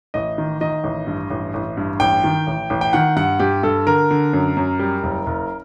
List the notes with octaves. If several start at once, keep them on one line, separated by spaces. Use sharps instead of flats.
A1 D#5
D#3
D#3 D#5
A1
G2
A1
A1
G2
A1 G5
D#3
A1
A1
G5
D#3 F#5
G2 F#5
G2 G4
G2 A4
D3 A#4
D3
F#2
F#2
G3
F#1
F#1